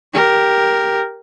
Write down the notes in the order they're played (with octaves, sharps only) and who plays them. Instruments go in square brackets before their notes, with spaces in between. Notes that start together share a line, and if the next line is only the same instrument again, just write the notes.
[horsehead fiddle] G4 A#4